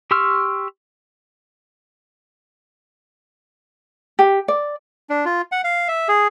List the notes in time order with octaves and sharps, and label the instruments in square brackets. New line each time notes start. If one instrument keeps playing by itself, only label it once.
[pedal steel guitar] G4 C6 C#6 E6 F6
[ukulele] G4
D5
[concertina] D4
F4
F#5
F5
E5
G#4